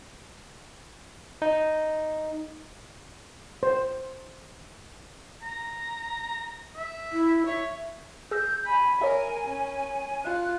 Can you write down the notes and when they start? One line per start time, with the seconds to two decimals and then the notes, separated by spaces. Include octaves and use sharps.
1.42 D#4
3.63 C5
5.42 A#5
6.76 E5
7.12 E4
7.46 C#5 E5
8.31 G#4 E6 G6 A#6
8.65 G#5 B5
9.02 A#4 C#5 D#5 E5
9.47 C#4
10.24 F4 F#6